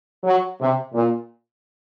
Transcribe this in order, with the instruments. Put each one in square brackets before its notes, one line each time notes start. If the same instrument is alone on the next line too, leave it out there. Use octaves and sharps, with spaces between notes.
[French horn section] F#3
C3
A#2